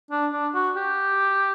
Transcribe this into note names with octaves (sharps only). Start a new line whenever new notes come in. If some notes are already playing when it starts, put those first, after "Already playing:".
D4
D4
F#4
G4